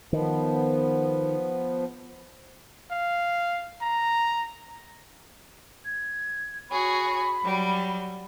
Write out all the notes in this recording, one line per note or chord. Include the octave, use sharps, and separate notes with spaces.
D#3 F3 B3
F5
A#5
G#6
F#4 G#4 C#5 B5
F#3 G3